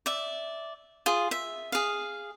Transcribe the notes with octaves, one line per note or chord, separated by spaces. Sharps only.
D5 E5
F4 G#4
E5
G#4 F5